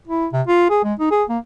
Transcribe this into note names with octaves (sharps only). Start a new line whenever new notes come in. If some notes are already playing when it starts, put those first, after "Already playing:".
E4
C3
F4
G#4
G#3
D#4
G#4
A#3